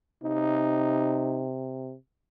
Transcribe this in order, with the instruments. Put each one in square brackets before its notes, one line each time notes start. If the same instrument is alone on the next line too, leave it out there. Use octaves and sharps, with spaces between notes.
[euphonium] C3 [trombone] D#4